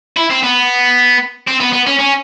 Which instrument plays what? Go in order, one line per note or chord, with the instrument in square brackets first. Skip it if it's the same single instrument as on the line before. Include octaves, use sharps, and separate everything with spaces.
[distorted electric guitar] E4
C4
B3
C4
B3
B3
C#4
C#4